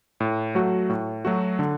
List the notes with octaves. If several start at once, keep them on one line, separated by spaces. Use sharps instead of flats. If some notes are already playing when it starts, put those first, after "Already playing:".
A2
F#3 A3 F#4
A2
F#3 A3 F#4
D3